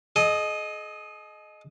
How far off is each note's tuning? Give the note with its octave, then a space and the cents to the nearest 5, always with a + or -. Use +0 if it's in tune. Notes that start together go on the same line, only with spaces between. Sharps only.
G#4 +45 D#5 -10